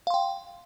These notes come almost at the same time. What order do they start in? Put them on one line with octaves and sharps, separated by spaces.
F5 C6 G5